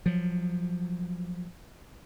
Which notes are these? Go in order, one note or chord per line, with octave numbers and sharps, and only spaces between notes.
F3 F#3